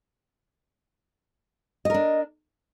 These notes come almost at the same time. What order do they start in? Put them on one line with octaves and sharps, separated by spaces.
D#5 A#4 D4